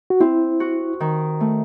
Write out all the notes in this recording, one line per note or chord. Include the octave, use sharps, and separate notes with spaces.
F#4
C4 E4
F#4
D#3
A3